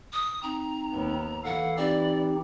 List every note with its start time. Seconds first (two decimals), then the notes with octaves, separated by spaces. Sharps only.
0.13 D#6
0.43 C4 D#4 A#5
0.90 D#2 B3
1.44 E3 A4 F5 F#5
1.77 C4 D#4 G4 D5